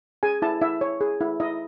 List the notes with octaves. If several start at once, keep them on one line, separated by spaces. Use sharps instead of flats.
G#4 G#5
E4 A5
E4 E5
C#5
G#4
E4
E4 D#5